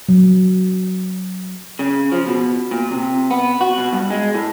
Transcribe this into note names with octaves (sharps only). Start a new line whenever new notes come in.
F#3
C#3
F3
B2
A#2
C3
B3
F#4
B2
G2
G#3
A2